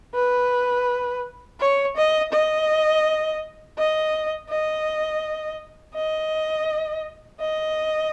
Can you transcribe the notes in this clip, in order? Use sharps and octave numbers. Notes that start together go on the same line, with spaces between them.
B4
C#5
D#5
D#5
D#5
D#5
D#5
D#5